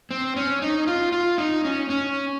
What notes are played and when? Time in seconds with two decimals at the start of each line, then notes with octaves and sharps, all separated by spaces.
0.11 C4
0.36 C#4
0.62 D#4
0.87 F4
1.12 F4
1.38 D#4
1.65 C#4
1.90 C#4